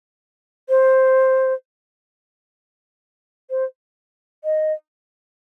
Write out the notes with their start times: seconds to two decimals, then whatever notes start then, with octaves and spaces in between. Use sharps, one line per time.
0.69 C5
3.50 C5
4.44 D#5